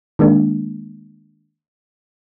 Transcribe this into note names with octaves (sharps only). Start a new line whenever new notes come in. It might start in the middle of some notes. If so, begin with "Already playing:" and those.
D#3 G#3 A#3 D4